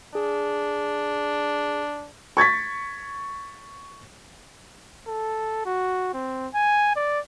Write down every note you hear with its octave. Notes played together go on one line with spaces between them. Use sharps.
D4 G#4
C#6 G#6 A6 B6
A4
F#4
C4
G#5
D5